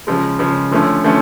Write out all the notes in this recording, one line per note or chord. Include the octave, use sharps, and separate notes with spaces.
C#3 F3 G#3
C#3 F3 G#3
D3 F3 A3 C#4
D3 F3 A3 C#4